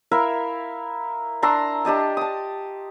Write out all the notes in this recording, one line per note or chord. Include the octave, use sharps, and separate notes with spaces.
E4 A#4 E5 F5
D4 A#5 C6 E6
D4 G4 D#5 A5
A5 D#6